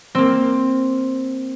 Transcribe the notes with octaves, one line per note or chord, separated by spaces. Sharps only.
A#3 C4